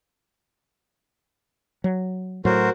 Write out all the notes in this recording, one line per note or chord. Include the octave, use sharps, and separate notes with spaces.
F#3
A2 F#3 F#4 A#4 C5